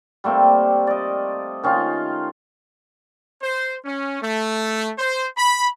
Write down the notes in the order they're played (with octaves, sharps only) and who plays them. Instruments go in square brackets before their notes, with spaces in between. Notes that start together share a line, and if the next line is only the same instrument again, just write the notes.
[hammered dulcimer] G3 A3 A#3 C4
D5 D#5
D#3 C#4 D#4 F4
[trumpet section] C5
C#4
A3
C5
B5